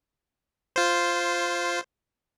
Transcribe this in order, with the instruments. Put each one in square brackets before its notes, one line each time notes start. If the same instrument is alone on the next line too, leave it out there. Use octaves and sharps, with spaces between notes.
[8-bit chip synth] F4 C5